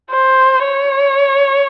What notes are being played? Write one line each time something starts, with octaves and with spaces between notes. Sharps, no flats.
C5
C#5